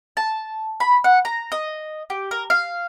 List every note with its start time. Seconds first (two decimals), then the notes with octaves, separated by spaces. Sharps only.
0.17 A5
0.80 B5
1.04 F#5
1.25 A#5
1.52 D#5
2.10 G4
2.31 A#4
2.50 F5